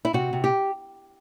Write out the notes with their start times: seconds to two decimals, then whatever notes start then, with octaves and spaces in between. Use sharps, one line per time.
0.05 E4
0.13 C3 F#4
0.33 C3
0.44 G4